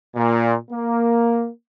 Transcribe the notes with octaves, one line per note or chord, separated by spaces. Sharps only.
A#2
A#3